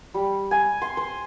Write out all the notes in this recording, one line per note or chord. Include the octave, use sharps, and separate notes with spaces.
G3
G#5
C6
C5